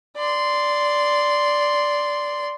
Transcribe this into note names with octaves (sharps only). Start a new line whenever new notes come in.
D5 C6